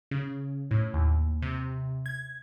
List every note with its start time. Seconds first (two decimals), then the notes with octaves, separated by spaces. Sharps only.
0.11 C#3
0.71 A2
0.94 D#2
1.42 C3
2.06 G#6